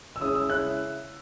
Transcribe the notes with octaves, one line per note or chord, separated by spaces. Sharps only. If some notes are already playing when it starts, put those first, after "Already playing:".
E6
C#3 G#3 C#4 E4 D#6
E6
C#3 G#3 C#4 E4 F#6